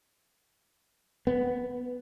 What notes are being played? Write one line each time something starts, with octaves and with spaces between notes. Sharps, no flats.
B3